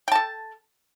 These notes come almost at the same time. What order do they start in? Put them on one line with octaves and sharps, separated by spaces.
G5 A5 A4